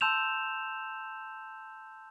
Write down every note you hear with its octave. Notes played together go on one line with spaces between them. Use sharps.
A5 C6 E6 G6 E7 F7